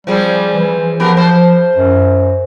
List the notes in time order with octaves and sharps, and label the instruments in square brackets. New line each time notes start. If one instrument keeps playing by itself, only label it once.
[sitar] F3 C4 G#4 [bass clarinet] G3
[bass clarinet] E3
[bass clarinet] F3 [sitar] B3 G4 A#4
[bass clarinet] F3 [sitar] C5
[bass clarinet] F#2